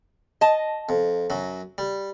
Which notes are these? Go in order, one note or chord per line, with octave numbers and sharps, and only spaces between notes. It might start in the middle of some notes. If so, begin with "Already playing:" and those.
D#5 A5
F2
F#2 F#3
G3